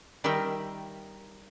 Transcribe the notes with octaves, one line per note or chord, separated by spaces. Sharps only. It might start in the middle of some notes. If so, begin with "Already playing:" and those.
D#3 G3 D#4 A#4 E5 G5